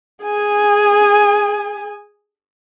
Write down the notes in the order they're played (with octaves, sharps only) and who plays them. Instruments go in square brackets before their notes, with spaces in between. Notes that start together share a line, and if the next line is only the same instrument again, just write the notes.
[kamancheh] G#4 G#5